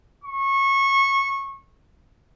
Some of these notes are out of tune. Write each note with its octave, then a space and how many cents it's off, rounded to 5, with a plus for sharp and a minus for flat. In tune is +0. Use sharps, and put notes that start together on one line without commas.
C#6 -20